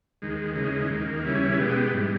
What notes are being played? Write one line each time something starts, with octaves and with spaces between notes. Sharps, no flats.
D#2 D#3 G#3
C#3 E3 G#3 D#4
D#2 D#3 A#3
C#3 E3 G3 C#4 E4
B2 G#3 B3 G4
G#2 E3 G3